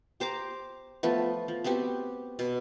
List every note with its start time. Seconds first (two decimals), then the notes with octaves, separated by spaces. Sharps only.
0.20 G4 C5 A#5 D6
1.03 F3 A3 B3
1.48 F3
1.64 B3 C4 F#4 G4
2.39 B2